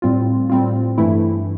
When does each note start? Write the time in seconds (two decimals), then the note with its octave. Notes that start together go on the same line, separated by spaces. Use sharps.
0.02 A2 G3 C4 F4
0.50 A2 G3 C4 F4
0.98 G2 E3 A3 E4